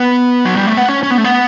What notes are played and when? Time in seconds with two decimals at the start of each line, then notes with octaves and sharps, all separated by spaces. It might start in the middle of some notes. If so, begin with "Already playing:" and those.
Already playing: B3
0.45 F#3
0.57 G3
0.67 A3
0.77 B3
0.89 C#4
1.03 C#4
1.11 B3
1.18 A3
1.24 B3